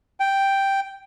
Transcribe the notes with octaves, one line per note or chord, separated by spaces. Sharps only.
G5